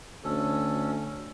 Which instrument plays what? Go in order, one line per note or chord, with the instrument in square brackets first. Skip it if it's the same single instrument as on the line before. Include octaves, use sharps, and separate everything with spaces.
[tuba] D2 [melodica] C#4 A4